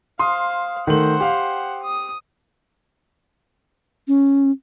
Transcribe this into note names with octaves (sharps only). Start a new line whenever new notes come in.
C5 F5 C6 D#6
D#3 A3 C5 F#5 F#7
G4 F5 G5
D#6
C#4